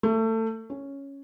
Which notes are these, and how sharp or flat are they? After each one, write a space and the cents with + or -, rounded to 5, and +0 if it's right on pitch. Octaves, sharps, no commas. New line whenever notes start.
A3 +25
C#4 +0